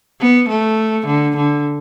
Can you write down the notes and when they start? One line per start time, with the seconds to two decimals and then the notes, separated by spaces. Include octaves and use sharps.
0.20 B3
0.48 A3
1.07 D3
1.36 D3